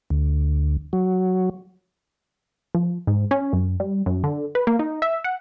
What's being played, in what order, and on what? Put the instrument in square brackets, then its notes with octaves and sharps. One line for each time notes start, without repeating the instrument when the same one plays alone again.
[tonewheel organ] D2
F#3
[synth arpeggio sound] F3
G#2
C#4
F#2
G3
F#2
D3
B4
A#3
D#4
E5
F#5